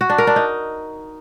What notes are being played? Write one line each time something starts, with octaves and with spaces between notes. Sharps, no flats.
F#4
D4
A#4
D4
D#4